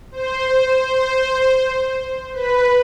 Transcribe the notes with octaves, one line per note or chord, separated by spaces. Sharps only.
C5
C5
B4